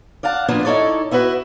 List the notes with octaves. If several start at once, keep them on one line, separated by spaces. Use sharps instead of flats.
D5 F5 F#5 A5
F3 A#3 B3 D4 F4
D#4 E4 A4 C#5 D5
B3 E4 F#4 B4